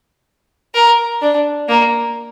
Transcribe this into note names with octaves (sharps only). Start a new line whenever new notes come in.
A#4
D4
A#3